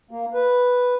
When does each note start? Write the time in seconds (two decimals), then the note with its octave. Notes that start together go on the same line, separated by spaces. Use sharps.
0.11 A#3
0.34 B4